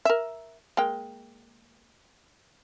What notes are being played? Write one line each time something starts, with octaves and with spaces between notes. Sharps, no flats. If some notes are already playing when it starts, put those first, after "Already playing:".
A#4 E5
G#3 A#3 G5